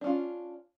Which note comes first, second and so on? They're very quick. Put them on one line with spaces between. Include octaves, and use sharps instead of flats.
D4 C#4 F4